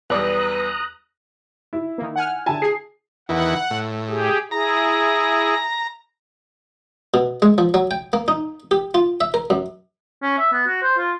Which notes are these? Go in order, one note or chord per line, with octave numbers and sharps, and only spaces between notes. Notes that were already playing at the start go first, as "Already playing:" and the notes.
B1 E2 G3 B4 D5 A#5 D#6 F#6
E4
D#3 A#3
F#5 G#5 F6
D3 E4 G#5 A5
G#4 C7
E2 D#3 E3 F#5
A2
G4 G#4
E4 G#4 A#5
B2
G#3
F3
F#3
G5
A#3
D#4
G4
F4
E5
A#4
F#2
C#4
E5
B3
F#4
C5
F4